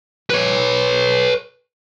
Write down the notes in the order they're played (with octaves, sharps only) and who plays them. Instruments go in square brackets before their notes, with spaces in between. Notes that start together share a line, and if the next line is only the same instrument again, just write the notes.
[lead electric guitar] B4 C#5